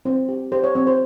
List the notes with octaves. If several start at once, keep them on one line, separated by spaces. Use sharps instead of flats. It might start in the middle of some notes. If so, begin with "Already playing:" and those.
C4 C5
G4
G4 C5
C#5
C4 C#5
C5